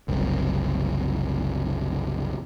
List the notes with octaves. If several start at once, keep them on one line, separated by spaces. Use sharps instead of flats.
F#1 C2